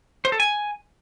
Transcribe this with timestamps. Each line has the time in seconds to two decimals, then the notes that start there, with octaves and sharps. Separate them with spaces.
0.25 C5
0.32 A4
0.40 G#5